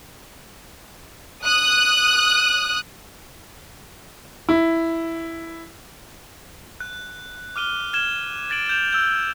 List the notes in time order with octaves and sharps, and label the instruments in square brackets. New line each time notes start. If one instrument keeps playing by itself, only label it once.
[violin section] D#6 F#6
[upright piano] E4
[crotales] F#6
D6 F6 D#7 G7
F6 G#6 E7 G7
G#6 A6 D7 F#7
G6 E7 F7
E6 G6